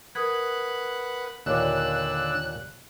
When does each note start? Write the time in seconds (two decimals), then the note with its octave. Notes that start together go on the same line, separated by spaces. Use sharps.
0.15 A#4 B4 F#5 D#6 G#6
1.46 D#2 A#2 D3 C#5 D5 D6 E6 F#6